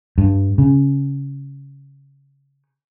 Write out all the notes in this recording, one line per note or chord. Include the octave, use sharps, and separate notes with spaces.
G2
C#3